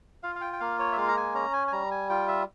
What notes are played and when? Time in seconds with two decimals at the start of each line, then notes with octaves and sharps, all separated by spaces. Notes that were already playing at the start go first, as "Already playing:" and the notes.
0.23 F4 F5
0.35 F5
0.41 G5
0.53 G5
0.60 A#3 F5
0.79 C#5
0.92 E5
0.97 G#3 F5
1.08 A#5
1.17 G#5
1.34 C#4 A#5
1.53 G#5
1.67 G#5
1.72 G3 A#5
1.91 G#5
2.10 F4 G5
2.28 E5